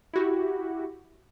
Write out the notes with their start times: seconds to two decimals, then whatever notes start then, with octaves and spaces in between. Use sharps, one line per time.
0.13 E4 F#4 G4